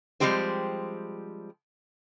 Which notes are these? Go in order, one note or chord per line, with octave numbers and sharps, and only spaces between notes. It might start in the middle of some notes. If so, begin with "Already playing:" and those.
F3 G3 G#3 C4 G4 C5